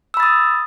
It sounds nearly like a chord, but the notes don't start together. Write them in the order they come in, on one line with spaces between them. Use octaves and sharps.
E6 B5 A6 D#6